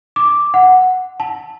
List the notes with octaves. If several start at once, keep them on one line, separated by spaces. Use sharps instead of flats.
D6
F#5
A5